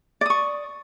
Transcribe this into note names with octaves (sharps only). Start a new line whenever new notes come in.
D5 C#6 D#6